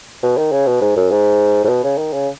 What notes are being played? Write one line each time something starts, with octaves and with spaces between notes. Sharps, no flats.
B2
D#3
C#3
B2
G#2
F#2
G#2
G#2
B2
C#3
D#3
C#3